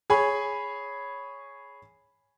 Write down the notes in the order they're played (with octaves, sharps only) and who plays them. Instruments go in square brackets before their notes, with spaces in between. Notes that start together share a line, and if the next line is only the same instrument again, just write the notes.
[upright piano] G#4 C#5 G#5 B5